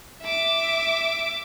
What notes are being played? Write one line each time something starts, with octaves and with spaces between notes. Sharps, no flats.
E5 D6